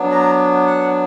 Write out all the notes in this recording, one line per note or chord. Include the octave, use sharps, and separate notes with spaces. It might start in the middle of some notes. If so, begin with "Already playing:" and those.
Already playing: F#3 B3 D4
A#5
F#5